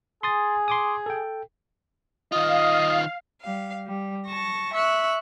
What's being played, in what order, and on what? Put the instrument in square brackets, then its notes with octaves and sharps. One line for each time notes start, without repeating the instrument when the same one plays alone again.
[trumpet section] G#4 [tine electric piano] C6 D#6 A6
[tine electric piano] C6 D6 D#6
A4 G5
[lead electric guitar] D#3 F4 [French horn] D#5 [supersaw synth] F5 [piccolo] D#6
[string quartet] G3 F5
G3
A5 C#6 A#6
E5 C#6 E6 F#6